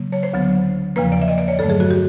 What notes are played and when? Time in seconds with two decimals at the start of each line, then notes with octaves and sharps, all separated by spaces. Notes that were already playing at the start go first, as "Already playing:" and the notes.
Already playing: C#3 F#3 A#3
0.12 C#5
0.23 C5
0.34 D2 D3 F#3 B3
0.96 E2 C#3 F3 A#3 B4
1.12 D5
1.22 E5
1.28 D#5
1.38 D5
1.48 C#5
1.59 G2 D3 F#3 A3 A4
1.70 G#4
1.80 F#4
1.91 G4